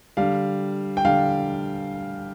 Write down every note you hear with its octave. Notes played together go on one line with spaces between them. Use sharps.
D3 G3 F5
G5
D3 G3 F5